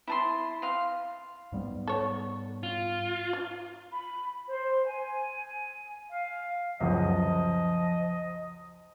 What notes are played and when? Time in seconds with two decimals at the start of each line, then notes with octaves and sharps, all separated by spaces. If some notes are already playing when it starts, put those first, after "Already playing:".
0.07 E4 A5 C6
0.62 F5 C6
1.52 G#2 G3 B3
1.88 A4 C#5
2.63 F4
3.33 F4
3.91 B5
4.49 C5
4.85 G#5
6.09 F5
6.81 C#2 F#2 F3 D#5